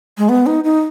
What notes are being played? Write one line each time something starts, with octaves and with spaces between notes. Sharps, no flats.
G#3
B3
D#4
D#4